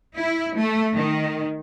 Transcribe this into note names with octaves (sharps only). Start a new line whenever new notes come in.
E4
A3
D#3